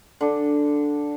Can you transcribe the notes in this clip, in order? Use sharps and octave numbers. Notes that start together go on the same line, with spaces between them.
D3 D4